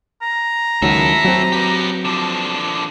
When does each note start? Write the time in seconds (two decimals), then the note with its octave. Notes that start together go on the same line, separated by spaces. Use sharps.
0.22 A#5
0.82 C#2 D#3 F#3 E4 A4
1.24 F#3 C4
1.52 G4 B4
2.05 D3 F3